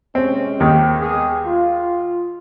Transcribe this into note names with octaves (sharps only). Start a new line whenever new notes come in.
C3 G#3 C4 C#4
D#2 D#3
G#3 B3 G#4
F4